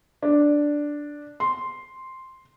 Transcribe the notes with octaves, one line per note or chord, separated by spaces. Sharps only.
D4
C6